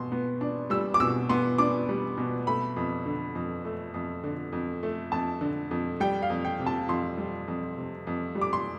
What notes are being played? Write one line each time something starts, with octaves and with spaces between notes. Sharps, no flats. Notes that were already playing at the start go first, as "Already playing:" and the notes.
Already playing: B2 C6
B3
D4
G3 E6
D6
B2 E6
B3 C6
D4 D6
G3
B2
A3 B5
F2
D3
F2
A3
F2
D3
F2
A3
F2 A5
D3
F2
G3 G5
F5
F2
G5
C3
A5
F2 C6
G3
F2
C3
F2
G3
D6
C6